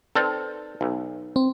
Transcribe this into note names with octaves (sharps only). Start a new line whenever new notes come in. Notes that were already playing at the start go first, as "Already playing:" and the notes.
C4 D#4 A4 B4 D5
B1
C4